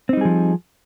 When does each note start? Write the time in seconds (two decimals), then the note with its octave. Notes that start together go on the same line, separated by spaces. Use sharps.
0.09 C4
0.13 D#4
0.17 G3
0.21 G#4
0.25 F3